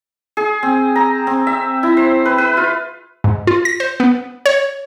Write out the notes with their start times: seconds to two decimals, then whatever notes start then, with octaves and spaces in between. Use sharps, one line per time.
0.37 G#4
0.63 C4
0.96 A#5
1.27 C4
1.47 E5
1.83 E4
1.97 C5
2.26 B4
2.38 B4
2.57 F4
3.24 G#2
3.47 F4
3.65 A#6
3.80 C5
4.00 B3
4.46 C#5